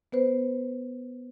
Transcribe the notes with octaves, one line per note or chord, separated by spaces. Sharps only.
B3 B4 C5